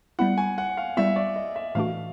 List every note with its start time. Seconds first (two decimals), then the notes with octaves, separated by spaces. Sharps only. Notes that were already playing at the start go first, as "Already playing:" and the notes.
0.19 G3 B3 E4 F#5
0.38 G#5
0.58 F#5
0.77 F5
0.97 G3 B3 E4 E5
1.16 D5
1.36 D#5
1.56 E5
1.75 A2 E3 A3 D4 F#4 F5